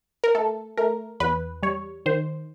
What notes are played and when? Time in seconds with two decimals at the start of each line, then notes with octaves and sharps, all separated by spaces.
0.24 A#4
0.35 A3 A4
0.77 A3 A#4
1.20 E2 B4
1.63 G3 C#5
2.06 D#3 C5